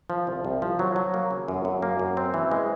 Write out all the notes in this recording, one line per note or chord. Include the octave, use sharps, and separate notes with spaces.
F3
C2
C2
F3
F#3
F#3
A#3
C#3
F#2
F#2
A#3
F#2
C4
E3
G#3